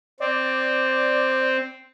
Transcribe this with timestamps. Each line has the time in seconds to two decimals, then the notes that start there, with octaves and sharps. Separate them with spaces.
0.20 C4 D5